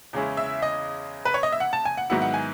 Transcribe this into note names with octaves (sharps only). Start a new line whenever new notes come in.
E2 C#3 G#3 C#4 E4
E5
D#5
B4
C#5
D#5
E5
F#5
A5
G#5
F#5
G#2 D#3 F#3 B3 E4 F#5
F#5
G#5